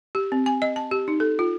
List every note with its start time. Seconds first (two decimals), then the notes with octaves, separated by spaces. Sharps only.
0.15 G4
0.32 C4
0.46 G#5
0.62 D#5
0.76 A5
0.91 G4
1.08 D#4
1.20 A4
1.39 F4